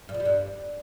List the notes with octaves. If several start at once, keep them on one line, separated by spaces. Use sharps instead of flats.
G2
F2
G3
G2